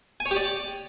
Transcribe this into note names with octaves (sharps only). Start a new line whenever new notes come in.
G#5
C#5
G4
D5